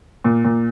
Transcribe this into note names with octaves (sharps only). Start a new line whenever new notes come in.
A#2
A#2